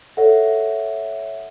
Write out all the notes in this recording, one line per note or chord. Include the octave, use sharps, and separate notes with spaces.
A4 C#5 E5 F#5